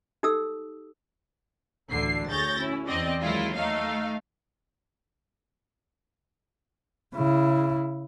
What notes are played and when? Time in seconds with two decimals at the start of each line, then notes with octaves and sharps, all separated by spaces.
0.23 D#4 G4 A4 D#6 E6
1.91 A1 D2 D3 C7
2.28 D2 G#4 C#5 G6 A6 A#6
2.57 C#4 E4
2.88 E2 C4 D5 D#5
3.22 D#2 F#3 G#3 E4 F4
3.55 A3 D#4 F5
7.15 C#3 E4